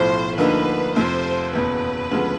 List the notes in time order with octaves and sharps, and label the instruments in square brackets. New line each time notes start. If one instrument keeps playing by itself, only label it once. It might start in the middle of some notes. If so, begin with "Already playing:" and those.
Already playing: [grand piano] B1 A2 F3 [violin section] C5
[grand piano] D2 D3 F3 A#3 D#4 [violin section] B4
[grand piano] F1 F2 C3 F3 [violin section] C5
[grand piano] F#1 E2 B2 [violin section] B4
[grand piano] D2 C#3 F3 G#3 B3